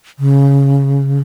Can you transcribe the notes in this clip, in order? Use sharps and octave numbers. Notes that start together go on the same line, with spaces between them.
C#3